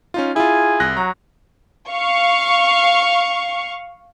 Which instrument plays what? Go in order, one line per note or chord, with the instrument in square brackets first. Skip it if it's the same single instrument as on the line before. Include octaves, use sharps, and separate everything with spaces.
[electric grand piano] C#4 D#4 F4
[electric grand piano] E4 F4 [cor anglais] G#4
[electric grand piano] C2 F#6 A#6
[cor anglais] F#3 [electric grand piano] A#5
[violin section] F5 C#6